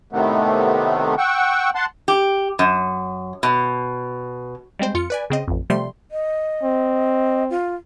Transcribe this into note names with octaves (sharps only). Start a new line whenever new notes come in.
A2 C3 D#3 A3 B3
F#5 G5 C#6 E6
F#5 A5 C6
G4
F#2
B2
G3 G#3 C4 C5
F2 F4 C#7
B4 D5 G#5
C#3 C4 D#5
A1 F2
C3 F3 G3 A3 C6
D#5
C4
F4